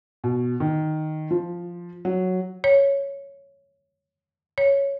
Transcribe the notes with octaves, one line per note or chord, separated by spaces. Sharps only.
B2
D#3
F3
F#3
C#5
C#5